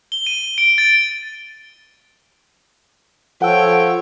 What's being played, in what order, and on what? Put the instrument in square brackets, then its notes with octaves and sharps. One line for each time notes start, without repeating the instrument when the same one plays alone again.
[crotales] G7
D#7
D7
A6
[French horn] F3 [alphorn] A4 [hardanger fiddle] C#5 G5 [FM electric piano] F#5 E6